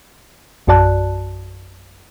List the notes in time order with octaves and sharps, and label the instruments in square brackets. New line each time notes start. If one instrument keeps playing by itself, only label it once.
[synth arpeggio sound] A#1 F#2 F#4 D5 A5 F#6